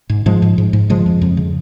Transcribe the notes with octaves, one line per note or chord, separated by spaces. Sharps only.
G#2
G#2 F3 G#3
G#2
G#2
G#2
C#3 F3 G#3
F2
F2
C#3